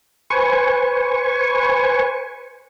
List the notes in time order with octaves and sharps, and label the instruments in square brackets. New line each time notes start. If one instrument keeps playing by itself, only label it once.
[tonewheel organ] B4 C5 G#5 C#6